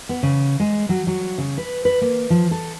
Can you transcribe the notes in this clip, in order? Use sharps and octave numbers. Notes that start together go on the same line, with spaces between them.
B3
C#3
G#3
F#3
F#3
C#3
B4
B4
A#3
F3
A4